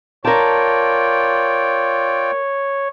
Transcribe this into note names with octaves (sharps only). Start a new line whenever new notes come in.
F4 A#4 C#5 D5 G5 A5